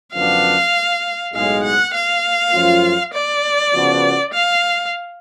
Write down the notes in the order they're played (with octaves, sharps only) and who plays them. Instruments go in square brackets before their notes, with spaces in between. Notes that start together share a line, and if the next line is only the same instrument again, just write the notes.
[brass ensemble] F#2 D3 F3 B3 D4 [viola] F5
[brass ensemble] B1 A2 G#3 [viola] F5
[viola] F#5
F5
[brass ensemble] F#2 F3 A3 C#4 F4
[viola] D5
[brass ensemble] C#3 F3 B3 F#4
[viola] F5